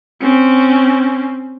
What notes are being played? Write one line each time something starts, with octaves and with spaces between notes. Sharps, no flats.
C4 C#4